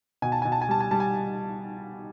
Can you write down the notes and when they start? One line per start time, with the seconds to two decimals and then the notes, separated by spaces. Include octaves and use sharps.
0.22 B2 G#5
0.32 A5
0.42 B2 G#5
0.52 A5
0.62 G#5
0.69 G3 A5
0.80 G#5
0.91 G3 A5
1.00 G#5